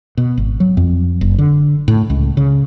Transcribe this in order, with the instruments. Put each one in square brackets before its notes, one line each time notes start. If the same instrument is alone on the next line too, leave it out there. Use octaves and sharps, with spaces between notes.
[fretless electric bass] B2
G#1
F#3
F2
F#1
D3
A2
C#2
C#3